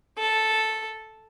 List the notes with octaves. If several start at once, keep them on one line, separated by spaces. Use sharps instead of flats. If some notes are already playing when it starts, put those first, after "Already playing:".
A4